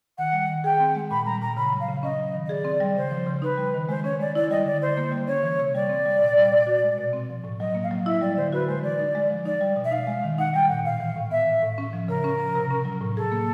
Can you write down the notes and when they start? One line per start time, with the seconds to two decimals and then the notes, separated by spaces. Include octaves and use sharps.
0.18 D#3 F#5
0.33 G3
0.49 D#3
0.64 G#4 G5
0.80 C4
0.95 G#3
1.11 A#2 B5
1.26 G3 A#5
1.41 A#2 A#5
1.57 C#3 B5
1.73 F#3
1.80 F5
1.88 C#3
2.03 C#4 D#5
2.19 F#3
2.34 D#3
2.45 D#5
2.49 G#4 D5
2.65 C4
2.80 G3
2.96 C#3 C5
3.11 F3
3.27 C#3
3.42 D#4 B4
3.57 G3
3.74 D#3
3.89 G#3 C5
4.04 C#4 C#5
4.20 G#3 D5
4.35 E4 D5
4.50 G3 D#5
4.66 D3 D5
4.81 E4 C5
4.97 A#3
5.12 G3
5.27 C#4 C#5
5.43 E3
5.59 C3
5.75 G3 D5
5.89 C4
6.06 G3
6.21 A#2
6.37 G3
6.51 A#2
6.67 F#4
6.83 G#3
6.98 B2
7.13 C4
7.29 F3
7.44 A2
7.60 F#3 D#5
7.75 A#3
7.83 F5
7.91 F#3
8.06 E4 E5
8.21 G3 D5
8.37 D3 C5
8.52 F#4 B4
8.68 G#3 C5
8.83 E3 D5
8.99 D#4
9.15 G#3
9.30 F3
9.46 D#4 D5
9.61 G3
9.76 B2
9.84 E5
9.91 D#4 F5
10.07 G#3
10.23 D#3
10.38 D#4 F#5
10.54 G3 G5
10.69 A#2 F#5
10.84 A2 F5
11.00 E3
11.16 A2
11.30 B3 E5
11.47 E3
11.62 A2
11.78 C#4
11.93 F3
12.08 C#3 A#4
12.24 C#4
12.39 F3
12.55 C3
12.70 C#4
12.85 F#3
13.01 A2
13.16 G#4 A4
13.32 A#3